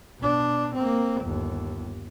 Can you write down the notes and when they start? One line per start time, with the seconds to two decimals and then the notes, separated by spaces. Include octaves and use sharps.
0.19 B2 D4
0.75 A#3 C4
1.22 G1 D#2